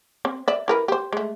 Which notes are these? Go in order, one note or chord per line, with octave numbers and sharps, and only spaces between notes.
C4
D5 E5
E4 A#4 B4
G4 C5
G#3 A3